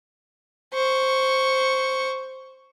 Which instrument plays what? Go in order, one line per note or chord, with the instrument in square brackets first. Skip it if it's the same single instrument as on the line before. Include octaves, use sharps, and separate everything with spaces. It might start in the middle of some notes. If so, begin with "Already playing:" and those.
[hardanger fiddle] C5 C#6